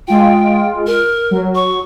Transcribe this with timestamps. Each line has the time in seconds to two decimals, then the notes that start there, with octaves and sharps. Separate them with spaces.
0.08 G#3 F4 G5
0.87 A#4
1.31 F#3
1.55 C#6